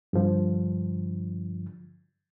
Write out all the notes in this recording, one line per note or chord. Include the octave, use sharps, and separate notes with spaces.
G2 D3 F3